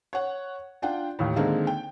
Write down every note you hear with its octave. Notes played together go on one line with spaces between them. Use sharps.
C#5 F#5
D4 F4 F#5 G5
D#2 A2
D3 D#3 G#3 A#3 C4 D#4
G5